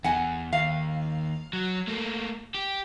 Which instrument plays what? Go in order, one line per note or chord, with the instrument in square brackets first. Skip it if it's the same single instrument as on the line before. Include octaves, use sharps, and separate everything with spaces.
[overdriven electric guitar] E2 [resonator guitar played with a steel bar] F#5 G#5
[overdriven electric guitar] D#2 [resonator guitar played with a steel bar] F5
[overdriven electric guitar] F#3
A3 A#3
G4